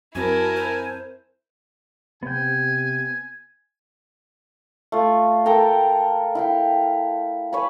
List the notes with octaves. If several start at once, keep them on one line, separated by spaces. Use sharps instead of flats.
F#2 C4 E4 F#4 A#4 G#5 A5
C5
C3 B3 G5 G#5
A3 F4
A4 A#4 G5 A#5
E4 F5 G5
B4 C#5 G#5 B5